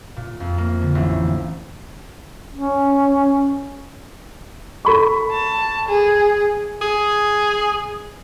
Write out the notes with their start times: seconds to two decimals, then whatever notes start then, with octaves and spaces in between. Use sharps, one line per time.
0.16 A#2
0.40 F2
0.58 A#3
0.82 D3
0.95 A1
2.54 C#4
4.85 A4 B5 C#6
5.31 A5
5.89 G#4
6.81 G#4